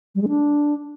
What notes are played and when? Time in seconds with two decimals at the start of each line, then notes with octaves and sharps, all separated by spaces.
0.15 G3
0.22 G#3
0.28 D4